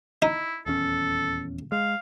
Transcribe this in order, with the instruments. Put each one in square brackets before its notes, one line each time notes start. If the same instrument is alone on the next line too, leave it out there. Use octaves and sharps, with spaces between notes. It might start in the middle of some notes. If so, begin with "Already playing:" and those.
[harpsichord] D#4 [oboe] E4
[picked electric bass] D#1 E2 C#4 [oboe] A4
[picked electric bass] G#3 [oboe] F5